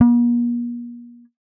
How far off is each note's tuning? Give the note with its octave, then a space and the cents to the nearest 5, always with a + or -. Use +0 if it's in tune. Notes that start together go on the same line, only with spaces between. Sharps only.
A#3 +45